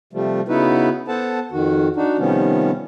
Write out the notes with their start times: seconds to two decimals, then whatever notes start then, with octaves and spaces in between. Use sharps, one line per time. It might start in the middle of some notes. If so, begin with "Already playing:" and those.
0.13 C3 F3 G3 A3
0.49 C#3 B3 D#4 E4 F#4 B4
1.08 B3 A4 C5 F#5 A5
1.52 F2 D#3 F#4
1.96 D4 D#4 F#4
2.19 C3 D#3 F3 G3 B3 C#4